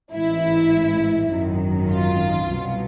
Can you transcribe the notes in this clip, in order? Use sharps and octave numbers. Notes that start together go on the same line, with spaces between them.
A1 G#2 E3 G#3 E4
G#1 F#2 D#3 F#3
F4
C2 B2 F#3